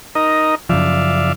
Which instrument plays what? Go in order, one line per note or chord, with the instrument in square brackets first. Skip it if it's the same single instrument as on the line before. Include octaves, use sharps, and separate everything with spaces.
[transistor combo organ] D#4 A#4 D#5
[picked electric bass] F#2 C#3 F3 [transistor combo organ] D5 E5 F5